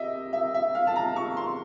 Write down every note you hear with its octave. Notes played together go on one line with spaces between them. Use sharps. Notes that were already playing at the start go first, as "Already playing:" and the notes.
Already playing: C3 D#5 E5
E5
E5
F5
A5
A#5
C#6
C6